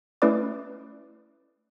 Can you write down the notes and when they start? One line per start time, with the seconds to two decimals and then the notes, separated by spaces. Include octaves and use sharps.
0.22 A3 C#4 E4 B4 D5 D6